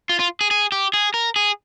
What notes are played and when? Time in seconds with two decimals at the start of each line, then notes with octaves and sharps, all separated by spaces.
0.09 F4
0.19 F4
0.41 G#4
0.51 G#4
0.72 G4
0.94 G#4
1.14 A#4
1.36 G#4